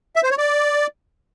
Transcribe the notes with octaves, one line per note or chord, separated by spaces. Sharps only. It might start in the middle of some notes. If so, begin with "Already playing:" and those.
E5
C5
C#5
D5